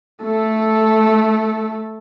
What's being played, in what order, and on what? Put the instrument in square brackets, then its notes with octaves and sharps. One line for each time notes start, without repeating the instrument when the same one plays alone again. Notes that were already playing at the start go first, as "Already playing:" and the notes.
[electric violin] A3 A4